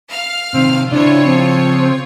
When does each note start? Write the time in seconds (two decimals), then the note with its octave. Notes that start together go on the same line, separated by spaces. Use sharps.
0.11 F5 F6
0.54 C3 D#3 C4
0.92 C#3 D4 E4 F4 C5 C#5
1.25 F3 C4